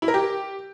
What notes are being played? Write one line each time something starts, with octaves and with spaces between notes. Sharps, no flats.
E4
A#4
G4